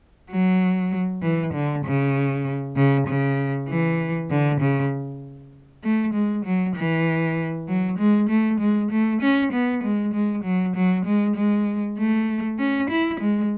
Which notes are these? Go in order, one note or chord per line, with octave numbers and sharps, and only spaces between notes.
F#3
E3
D3
C#3
C#3
C#3
E3
D3
C#3
A3
G#3
F#3
E3
F#3
G#3
A3
G#3
A3
C#4
B3
G#3
G#3
F#3
F#3
G#3
G#3
A3
C#4
E4
G#3